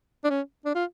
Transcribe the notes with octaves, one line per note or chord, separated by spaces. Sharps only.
D4
C#4
D4
F4